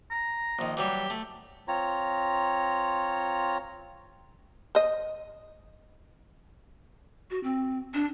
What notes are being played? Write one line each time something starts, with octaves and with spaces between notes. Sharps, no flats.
A#5
A#1 D#3
E3 F#3 G3 G4
A3
C4 F4 C#5 A#5
C5 D#5
F#4
C4
D4